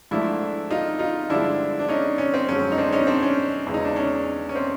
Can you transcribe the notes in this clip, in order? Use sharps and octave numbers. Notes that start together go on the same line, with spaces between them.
G#2 F3 A3 D4 E4
D#4 F4
D#4 F4
G2 D3 F3 G#3 D4 E4
D4
C#4 D#4
C#4
C4
F#2 D3 F3 G#3 C#4
D#4
C4 D4
C#4 D#4
C4 D4
C#4
E2 C#3 E3 G#3
D#4
D4
C#4
C#4
C4